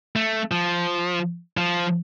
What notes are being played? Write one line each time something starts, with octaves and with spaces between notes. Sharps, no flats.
A3
F3
F3